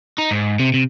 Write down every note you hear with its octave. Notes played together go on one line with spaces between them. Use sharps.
D#4
G#2
C3
C3